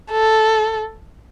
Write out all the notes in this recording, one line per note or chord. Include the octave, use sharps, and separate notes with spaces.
A4